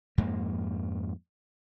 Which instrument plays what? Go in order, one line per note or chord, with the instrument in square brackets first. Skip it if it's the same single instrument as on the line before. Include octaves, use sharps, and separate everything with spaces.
[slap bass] F2 G#2 A#3